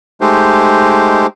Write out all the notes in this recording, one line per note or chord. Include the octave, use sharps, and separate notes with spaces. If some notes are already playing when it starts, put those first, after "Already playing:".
G#3 A3 D#4 G4 C5